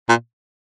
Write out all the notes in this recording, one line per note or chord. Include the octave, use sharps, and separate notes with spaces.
A#2